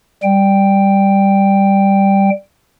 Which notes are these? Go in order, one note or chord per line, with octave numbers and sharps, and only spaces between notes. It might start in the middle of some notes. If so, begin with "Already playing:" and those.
G3 G5